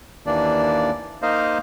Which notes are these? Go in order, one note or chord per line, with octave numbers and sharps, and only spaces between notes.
D#2 E3 A#3 D4 D5
A#3 D#4 C5 D#5 F5